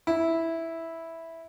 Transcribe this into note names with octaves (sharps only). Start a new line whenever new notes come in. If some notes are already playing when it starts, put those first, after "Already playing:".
E4